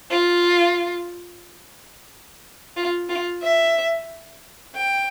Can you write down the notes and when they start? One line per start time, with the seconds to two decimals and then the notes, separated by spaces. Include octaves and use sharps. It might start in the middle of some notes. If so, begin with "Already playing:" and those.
0.11 F4
2.77 F4
3.09 F4
3.42 E5
4.75 G5